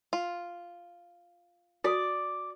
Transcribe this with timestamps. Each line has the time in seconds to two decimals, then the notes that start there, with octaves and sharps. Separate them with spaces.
0.13 F4
1.84 F#4 D5 D#6